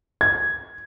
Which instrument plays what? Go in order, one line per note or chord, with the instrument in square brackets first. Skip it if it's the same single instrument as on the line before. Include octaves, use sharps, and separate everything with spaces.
[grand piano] G#6